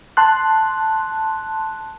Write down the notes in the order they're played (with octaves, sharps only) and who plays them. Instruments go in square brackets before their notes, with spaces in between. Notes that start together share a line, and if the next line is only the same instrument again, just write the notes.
[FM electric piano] A5 C6 F#6